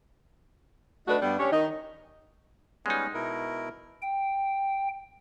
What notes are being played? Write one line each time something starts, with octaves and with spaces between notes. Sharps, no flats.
A3 D4 D#4 F#4 B4
G2 G3 B3
C#4 D4 G4 C#5
D#3 D#4
G3 G#3 B3 C#4 D#4
B2 E4 A#4
G5